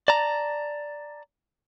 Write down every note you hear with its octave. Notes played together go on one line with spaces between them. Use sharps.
D5 A5 A#5